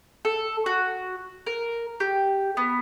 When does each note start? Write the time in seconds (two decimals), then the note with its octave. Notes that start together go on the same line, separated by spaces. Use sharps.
0.25 A4
0.66 F#4
1.47 A#4
2.00 G4
2.57 B3